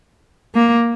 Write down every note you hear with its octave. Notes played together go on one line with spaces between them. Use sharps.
A#3